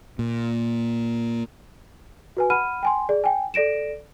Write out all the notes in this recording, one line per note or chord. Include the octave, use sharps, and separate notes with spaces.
A#2
F#4 B4 G#5
F#5 B5 F6 D#7
G5 G#5 C6
G#4 D5
G5 G#5
A4 D5 A#6 D7 E7